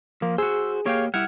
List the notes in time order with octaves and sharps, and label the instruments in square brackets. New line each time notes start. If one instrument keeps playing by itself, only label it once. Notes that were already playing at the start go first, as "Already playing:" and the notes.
[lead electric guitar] F3 [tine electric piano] A#3
[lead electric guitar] F#4 C5 [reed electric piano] G#4 [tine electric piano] E6
[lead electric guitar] A#3 G4 [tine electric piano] C#5 F5 G5
[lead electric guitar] G3 E4 [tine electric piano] F#5 F6 G#6